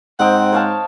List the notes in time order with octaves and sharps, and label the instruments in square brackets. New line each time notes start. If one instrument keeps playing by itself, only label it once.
[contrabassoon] G#2 [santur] C4 D#5 G5 [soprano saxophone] F#5
[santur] C#5 F5 A5